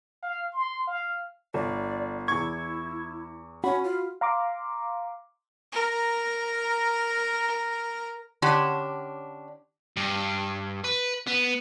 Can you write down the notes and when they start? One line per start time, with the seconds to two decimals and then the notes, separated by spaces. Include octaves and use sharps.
0.22 F5
0.53 C6
0.87 F5
1.54 G1 D5
2.28 E2 E4 C#6 G#6
3.64 C#4 F#4 B5
3.84 F4
4.21 F5 A#5 C6 D6
5.72 A#4 A#5
8.42 D3 C#4 D4 G4
9.96 G2
10.84 B4
11.27 B3